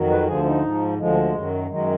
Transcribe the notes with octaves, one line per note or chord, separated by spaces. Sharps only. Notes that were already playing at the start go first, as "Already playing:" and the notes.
Already playing: F2 D#3 F#3
B4
D2 D3 F3 G#4
D#4
G#2 F3
D2 D3 F3 G#3
F#2 D#3 F#3
F#2 D#3 F#3 G#3